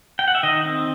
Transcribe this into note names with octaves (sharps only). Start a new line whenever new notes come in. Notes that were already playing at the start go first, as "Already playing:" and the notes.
G5
F#5
E5
D#3 D#5
C4